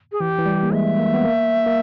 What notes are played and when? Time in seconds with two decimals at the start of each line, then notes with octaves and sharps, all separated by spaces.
0.12 G#4
0.20 E3 G4
0.38 E3
0.46 G3
0.63 A#3
0.72 G#3 E5
0.99 A#3
1.14 B3
1.24 A#3
1.66 A#3